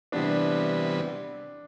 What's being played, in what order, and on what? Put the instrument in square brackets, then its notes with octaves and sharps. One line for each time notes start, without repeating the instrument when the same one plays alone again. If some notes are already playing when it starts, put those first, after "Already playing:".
[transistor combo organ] C3 E3 G3 B3 [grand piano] D4